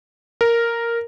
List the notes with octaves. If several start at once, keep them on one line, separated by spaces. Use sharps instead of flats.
A#4